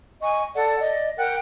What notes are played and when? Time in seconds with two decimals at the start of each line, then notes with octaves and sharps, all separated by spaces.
0.22 D#5 G#5 C#6
0.55 A4 D5 F#5
0.79 D5 D#5
1.17 A#4 F#5 G5 F#6